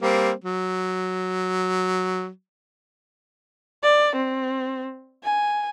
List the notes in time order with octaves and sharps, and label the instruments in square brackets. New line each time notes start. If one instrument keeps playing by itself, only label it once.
[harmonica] G3 A#3 C4
F#3
[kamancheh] D5
C4
G#5